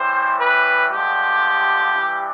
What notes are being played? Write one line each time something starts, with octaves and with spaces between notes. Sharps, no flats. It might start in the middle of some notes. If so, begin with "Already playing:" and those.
Already playing: A2 E3 G3 C5
B4
G2 D3 F3 G#3 G4
G2 E3 G3